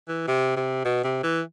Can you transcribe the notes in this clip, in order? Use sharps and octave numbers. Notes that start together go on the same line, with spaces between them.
E3
C3
C3
B2
C3
E3